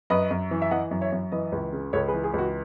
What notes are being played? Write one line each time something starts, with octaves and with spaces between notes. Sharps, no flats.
F#2 B4 D#5
F#2
E3
E5
E3 D#5 F#5
F#2
C#5 E5
F#2
E3 B4 D#5
C#2
C#3
C#2 A4 C#5
G#4 B4
E3
G#4
C#2 F#4